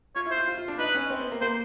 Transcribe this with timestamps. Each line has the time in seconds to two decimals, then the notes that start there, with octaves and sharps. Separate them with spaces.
0.16 F4 C#5
0.26 E4
0.31 C5
0.37 F4
0.48 F4
0.58 F4
0.68 D4
0.79 D#4 B4
0.95 C#4
1.10 C4
1.20 B3
1.31 A#3
1.41 A#3 C5